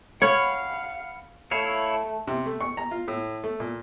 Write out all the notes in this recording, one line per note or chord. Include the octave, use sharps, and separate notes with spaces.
C#5 F5 F#5 B5 F6
A3 E4 C#5 F5
C3
A3
C#6
A#5
F4
A2
A3
A#2